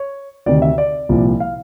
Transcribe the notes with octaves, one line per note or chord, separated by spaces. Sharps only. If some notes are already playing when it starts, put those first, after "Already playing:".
Already playing: C#5
D2 C3 D#3 D5
E5
D5
C2 A#2 F3
F5